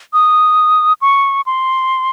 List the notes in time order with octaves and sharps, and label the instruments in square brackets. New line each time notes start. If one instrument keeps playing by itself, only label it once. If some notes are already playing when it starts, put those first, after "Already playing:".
[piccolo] D#6
C#6
C6